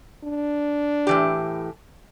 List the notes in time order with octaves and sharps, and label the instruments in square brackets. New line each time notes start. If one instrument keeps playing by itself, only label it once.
[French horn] D4
[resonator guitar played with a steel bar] A2 E3 G4